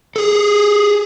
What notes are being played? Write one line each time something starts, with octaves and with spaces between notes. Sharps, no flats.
G#4 A4